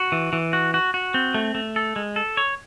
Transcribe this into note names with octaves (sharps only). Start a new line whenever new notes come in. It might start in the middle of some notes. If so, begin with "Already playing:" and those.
Already playing: F#4
E3
E3
F#4
F#4
F#4
C4
A3
A3
A4
G#3
A4
C#5